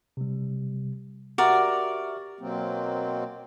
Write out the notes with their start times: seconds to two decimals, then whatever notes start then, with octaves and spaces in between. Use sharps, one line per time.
0.17 C3 G3
1.38 F#4 G4 A#4 D5 E5
2.40 B2 F#3 A#3 C4